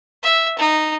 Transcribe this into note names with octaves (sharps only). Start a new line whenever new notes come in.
E5
D#4